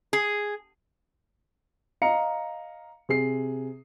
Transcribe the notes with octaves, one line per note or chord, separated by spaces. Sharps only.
G#4
D#5 F5 A#5 C#7
C3 G#4 C7